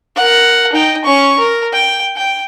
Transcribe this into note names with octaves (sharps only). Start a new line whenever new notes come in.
A#4 F#5
D#4 G5
C#4 C#6
A#4
G5
G5